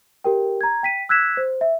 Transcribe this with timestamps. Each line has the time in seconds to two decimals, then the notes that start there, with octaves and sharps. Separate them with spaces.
0.24 G4 A#4 G5
0.61 A#5 G#6
0.83 G5 B6 D#7
1.09 E6 F#6 G#6 B6 E7
1.37 C5
1.61 E5